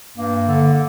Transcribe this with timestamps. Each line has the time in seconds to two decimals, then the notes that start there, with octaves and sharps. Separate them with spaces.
0.16 G2 A#3
0.46 D3